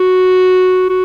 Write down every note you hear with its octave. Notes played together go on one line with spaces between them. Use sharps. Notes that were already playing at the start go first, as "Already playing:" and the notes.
Already playing: F#4
F#4